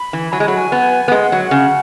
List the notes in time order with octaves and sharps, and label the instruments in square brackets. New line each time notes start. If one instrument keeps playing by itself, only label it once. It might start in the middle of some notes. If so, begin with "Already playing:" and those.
Already playing: [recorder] B5
[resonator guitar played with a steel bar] E3
[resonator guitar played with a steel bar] F#3 [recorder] G#5
[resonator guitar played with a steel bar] G#3
[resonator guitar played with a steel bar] F#3 [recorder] B5
[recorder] G#5
[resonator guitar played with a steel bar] B3
B3
[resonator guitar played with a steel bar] G#3 [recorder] F#5
[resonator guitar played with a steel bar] F#3
C#3